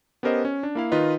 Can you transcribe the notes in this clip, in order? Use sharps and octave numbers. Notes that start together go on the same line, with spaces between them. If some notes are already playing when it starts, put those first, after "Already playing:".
B3 C#4 G4 A#4 C5 D#5
C#4
D4
A#3 E4 F5
D#3 D#4 F4 B4 D#5